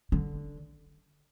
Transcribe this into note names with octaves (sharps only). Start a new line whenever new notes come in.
D3